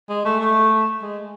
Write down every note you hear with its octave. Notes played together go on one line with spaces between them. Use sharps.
G#3
A3
A3
G#3